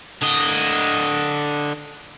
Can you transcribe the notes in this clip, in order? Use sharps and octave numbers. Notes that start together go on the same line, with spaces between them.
D3 D#5